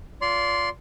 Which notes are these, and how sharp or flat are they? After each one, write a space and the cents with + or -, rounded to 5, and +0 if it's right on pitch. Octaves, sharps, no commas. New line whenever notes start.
F4 +0 D5 -30 C6 +0